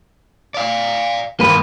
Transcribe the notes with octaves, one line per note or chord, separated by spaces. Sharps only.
D5 F5
G2 D#3 A#3 B4 C5